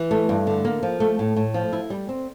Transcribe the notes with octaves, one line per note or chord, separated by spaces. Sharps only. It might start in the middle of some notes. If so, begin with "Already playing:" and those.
Already playing: E3
A3
G2
D3
A#3
F3
A3
A2
A2
F3
E4
G3
C4